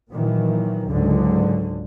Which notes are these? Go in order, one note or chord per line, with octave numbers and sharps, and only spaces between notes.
A#2 D#3 E3 F#3
C#2 G#2 D3 F#3